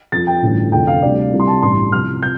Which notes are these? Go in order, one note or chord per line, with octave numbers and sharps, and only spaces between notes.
F2 F3 A6
G5
A1 G2 D3 F3
F1 F2 D3 G5
F5
D2 C3 G3 D5
C2 C3 G3
C6
A5
A1 G2 G3 C6
C2 C3 F3 F6
C3 F3 G6